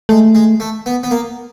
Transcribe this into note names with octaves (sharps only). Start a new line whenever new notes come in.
G#3 A3
G#3
A3
B3
B3
A#3